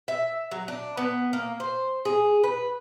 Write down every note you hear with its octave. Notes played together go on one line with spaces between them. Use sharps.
E5
F#3
D4
B3
A#3
C5
G#4
B4